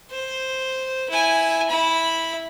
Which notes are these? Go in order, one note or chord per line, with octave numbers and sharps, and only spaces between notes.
C5
E4 G#5
E4 B5